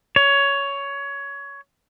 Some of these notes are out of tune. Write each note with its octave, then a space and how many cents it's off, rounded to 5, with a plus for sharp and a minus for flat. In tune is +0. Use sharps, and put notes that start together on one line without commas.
C#5 +15